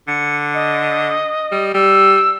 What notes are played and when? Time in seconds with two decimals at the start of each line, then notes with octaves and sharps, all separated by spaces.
0.08 D3 C#7
0.54 D#5
1.52 G3
1.74 G3 E6